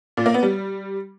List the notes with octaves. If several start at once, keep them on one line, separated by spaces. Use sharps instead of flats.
A#2
A#3
B3
G3